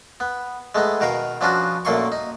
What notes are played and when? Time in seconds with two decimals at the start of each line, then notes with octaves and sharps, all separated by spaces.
0.20 B3
0.75 G#3 A3 B3 D#4
1.01 B2 D#3 A#4 F5 G5
1.41 F3 B3 C#4 D4 F4 F#4
1.85 F#2 A#2 A3 A#3 C6 C#6
2.12 D#4